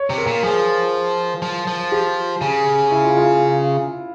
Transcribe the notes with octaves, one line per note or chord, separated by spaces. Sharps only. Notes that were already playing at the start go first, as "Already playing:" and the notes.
Already playing: C#5
C3
A#4
A#2
F3 G#4
F3
F3
G4
C#3
E4
F4
F4